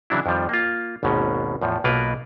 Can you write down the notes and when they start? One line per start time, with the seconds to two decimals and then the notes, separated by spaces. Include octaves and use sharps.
0.10 C#3 E3 F#3 D4 E4
0.26 F2 D#3 F3 G3
0.49 A#3 F4
1.03 G#1 D#2 G#2 B2 C#4
1.61 E2 A2 F3
1.84 B1 B2 A#3 F4 A#4 B4